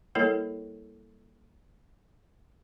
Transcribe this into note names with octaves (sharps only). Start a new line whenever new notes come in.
G3 A#3 E4 A4 A#4 C#5